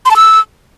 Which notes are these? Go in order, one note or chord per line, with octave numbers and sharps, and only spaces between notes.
C6
A5
E6